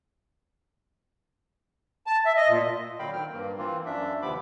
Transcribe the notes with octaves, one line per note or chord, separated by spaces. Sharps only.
A5
E5
D#5
A#2
A#2 D3 F#3 F5 G5 B5
D#3 C4 G5 F6
G2 A#3
E3 A#3 C4 F4
F#2 D4 E5
D#2 C3 F3 B3 B5 D6